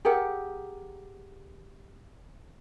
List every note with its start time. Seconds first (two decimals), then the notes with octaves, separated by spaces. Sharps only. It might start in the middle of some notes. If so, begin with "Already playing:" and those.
0.05 G4 G#4 A#4 F#5